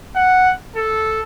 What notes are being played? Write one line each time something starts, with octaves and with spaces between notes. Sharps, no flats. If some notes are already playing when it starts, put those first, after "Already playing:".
F#5
A4